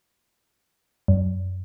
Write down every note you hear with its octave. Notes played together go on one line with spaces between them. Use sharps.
F#2